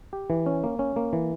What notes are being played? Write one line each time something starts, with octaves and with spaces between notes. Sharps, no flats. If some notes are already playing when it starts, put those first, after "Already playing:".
G4
E3
C#4
A#3
C#4
A#3
E3